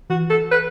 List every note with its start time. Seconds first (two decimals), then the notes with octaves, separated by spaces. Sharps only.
0.10 E3 F#4
0.30 A4
0.51 B4